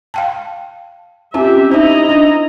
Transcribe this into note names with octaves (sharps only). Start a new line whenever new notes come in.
F5 G5 A5
C4 C#4 F4 G4 E5
D#4 E4 C5 D#5 A#5
D4